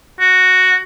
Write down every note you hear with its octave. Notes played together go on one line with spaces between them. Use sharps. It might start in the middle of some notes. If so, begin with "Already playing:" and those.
F#4